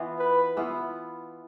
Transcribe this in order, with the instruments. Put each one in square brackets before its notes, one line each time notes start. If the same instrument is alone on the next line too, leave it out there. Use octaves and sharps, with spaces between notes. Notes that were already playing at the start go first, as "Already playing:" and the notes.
Already playing: [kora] E3 B3 F4
[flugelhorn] B4
[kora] E3 B3 F4